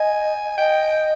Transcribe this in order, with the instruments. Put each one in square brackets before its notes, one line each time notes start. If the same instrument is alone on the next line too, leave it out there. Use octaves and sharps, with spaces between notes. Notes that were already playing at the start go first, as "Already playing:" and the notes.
Already playing: [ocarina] D#5 [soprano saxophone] G#5
[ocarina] D#5 [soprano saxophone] G5